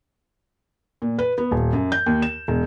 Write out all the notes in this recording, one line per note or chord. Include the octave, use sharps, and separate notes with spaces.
A#2
B4
B3
D#1
F#2
G6
D#2
E7
E1